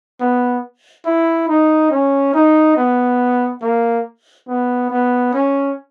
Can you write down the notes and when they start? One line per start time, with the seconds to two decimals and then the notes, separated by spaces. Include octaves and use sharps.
0.20 B3
1.05 E4
1.48 D#4
1.91 C#4
2.34 D#4
2.76 B3
3.62 A#3
4.48 B3
4.90 B3
5.33 C#4